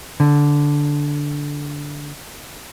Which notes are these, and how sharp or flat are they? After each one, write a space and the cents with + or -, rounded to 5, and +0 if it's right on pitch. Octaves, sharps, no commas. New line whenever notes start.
D3 -10